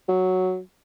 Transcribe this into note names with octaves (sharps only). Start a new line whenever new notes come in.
F#3